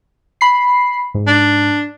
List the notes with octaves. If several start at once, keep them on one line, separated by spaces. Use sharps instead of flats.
B5 C7
G#2
D4